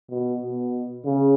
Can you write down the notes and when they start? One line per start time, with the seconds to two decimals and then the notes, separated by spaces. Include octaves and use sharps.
0.11 B2
0.41 B2
1.05 C#3